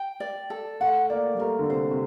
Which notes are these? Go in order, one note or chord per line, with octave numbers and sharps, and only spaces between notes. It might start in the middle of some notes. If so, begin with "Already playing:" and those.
Already playing: G5
D5
A4
A3 F#5
A#3 D5
G3
A3 A#4
D3
C3 C5
C3